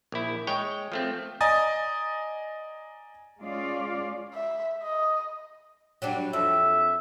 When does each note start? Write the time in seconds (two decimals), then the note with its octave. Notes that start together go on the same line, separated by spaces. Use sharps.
0.12 A#1 E4
0.47 G#3 C#5 G5
0.92 F3 A3 C4
1.41 D5 D#5 G#5 A#5 D#6 A6
3.40 G#3 C#4 F4 D5 F5
4.34 E5
4.83 D#5
6.02 F#3 G3 D4
6.33 F2 E5